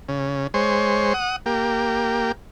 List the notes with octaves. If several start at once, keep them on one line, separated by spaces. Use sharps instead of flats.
C#3
G#3 C5 C#5
F#5 D#6
A#3 G4